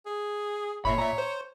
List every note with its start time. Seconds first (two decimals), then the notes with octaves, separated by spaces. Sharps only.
0.06 G#4
0.85 G1 A#2 C#5 E5 B5
0.98 A#2 E5 A#5
1.18 C5